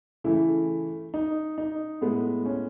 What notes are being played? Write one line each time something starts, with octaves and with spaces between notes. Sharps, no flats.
C#3 E3 A3 E4
D#4
D#4
A2 G#3 B3
C#4